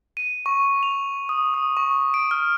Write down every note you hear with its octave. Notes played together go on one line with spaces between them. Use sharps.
D#7
C#6
F7
D#6
D#6
C#6
D7
F6